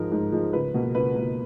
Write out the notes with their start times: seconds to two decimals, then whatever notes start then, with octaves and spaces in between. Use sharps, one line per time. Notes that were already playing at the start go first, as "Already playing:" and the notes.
Already playing: G#2 F3 G#3 D#4 A#4
0.12 G#2
0.32 F3 G#3 D#4
0.53 C#2 B4
0.74 B2 A#3
0.95 C#2 B4
1.15 B2 A#3